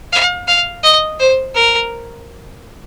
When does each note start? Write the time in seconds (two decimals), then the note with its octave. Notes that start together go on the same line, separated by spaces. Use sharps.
0.12 F5
0.48 F5
0.84 D#5
1.19 C5
1.55 A#4